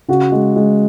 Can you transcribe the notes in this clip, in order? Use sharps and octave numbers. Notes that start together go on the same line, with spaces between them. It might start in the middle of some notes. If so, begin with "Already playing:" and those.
C#3 F#4
G#3
G#3